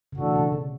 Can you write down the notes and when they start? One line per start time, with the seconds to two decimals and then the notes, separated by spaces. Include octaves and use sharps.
0.13 C#3
0.18 B2 E3 A3 D4 F#4 A4
0.36 C#3
0.52 D3